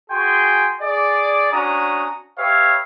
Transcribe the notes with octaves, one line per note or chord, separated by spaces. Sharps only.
F#4 G#4 G5 G#5 C6
G#4 D5
C#4 D4 F#4 A#5 D#6
G4 B4 C#5 E5 F5